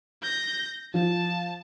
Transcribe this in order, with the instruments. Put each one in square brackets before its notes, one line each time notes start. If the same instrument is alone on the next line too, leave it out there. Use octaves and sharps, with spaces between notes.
[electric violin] G6 A#6
[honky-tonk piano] F3 [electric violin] A5